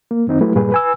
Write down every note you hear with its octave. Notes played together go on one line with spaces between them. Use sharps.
A#3
F#2 D#3 C4 D#4
F#3 A3 E4 G4 B4
G2 A#2 G3 G#4 B4
B4 G#5 E6